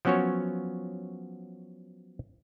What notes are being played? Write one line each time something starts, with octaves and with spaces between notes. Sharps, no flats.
F3 F#3 B3 C#4 F#4 C#5